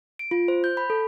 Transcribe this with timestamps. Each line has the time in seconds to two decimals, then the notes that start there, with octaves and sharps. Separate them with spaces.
0.19 D7
0.31 F4
0.48 C5
0.64 G6
0.77 B5
0.90 A4